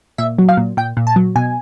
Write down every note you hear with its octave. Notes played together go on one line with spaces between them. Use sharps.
A#2 E5
F#3
F5
A#2
A#2 G5
A#2
A5
F#3
B2 G#5